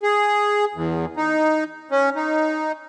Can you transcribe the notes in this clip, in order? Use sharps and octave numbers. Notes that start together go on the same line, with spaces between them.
G#4
E2
D#4
C#4
D#4